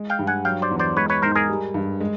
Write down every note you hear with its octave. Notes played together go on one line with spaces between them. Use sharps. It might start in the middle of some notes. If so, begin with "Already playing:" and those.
Already playing: G#3
F5 G5
G2
F#5 G#5
F#3 F5 G5
C5 D5
E2
C5 D5
G#3 B4 C#5
B4 C#5
G#2 A#4 C5
G#4 A#4
G3
G2
G#3